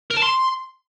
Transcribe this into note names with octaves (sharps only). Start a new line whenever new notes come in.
A#4
A5
C6